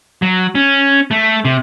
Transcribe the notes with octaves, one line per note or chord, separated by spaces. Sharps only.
F#3
C#4
A3
C3